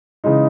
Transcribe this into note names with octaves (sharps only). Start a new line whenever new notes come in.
C#3 E3 G#3 D#4